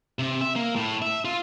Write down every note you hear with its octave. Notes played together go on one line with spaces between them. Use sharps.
C3
E5
A#3
A2
E5
F4